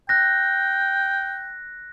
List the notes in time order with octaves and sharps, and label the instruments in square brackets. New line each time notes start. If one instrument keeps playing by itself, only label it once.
[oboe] G5 [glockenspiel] F#6 A#6